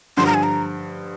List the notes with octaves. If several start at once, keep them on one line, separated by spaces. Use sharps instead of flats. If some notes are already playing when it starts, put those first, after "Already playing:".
G2 D3 F3 C6
A#5
G#5
A#5